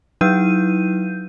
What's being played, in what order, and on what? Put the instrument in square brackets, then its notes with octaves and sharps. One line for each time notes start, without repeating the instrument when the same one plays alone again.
[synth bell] F#3 D#4 E4 B4 G6 D#7